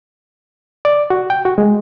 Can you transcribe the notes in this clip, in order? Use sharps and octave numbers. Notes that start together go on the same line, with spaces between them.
D5
F#4
G5
F#4
G#3